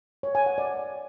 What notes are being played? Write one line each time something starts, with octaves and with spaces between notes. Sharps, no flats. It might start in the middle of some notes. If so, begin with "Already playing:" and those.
C#5
G#5
F#5
D5